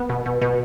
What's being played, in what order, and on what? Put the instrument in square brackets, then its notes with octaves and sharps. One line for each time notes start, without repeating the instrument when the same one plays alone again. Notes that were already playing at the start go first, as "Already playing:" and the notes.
Already playing: [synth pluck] B3
B2
B2
B2